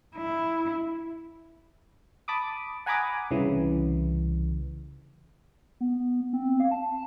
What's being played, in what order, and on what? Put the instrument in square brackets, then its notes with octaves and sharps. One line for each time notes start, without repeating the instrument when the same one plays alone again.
[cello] E4
[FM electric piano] A5 B5 D6 D#6
F#5 G#5 A#5 B5 D6 D#6
C2 C#3 E3
[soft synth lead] B3
C4
F5
A5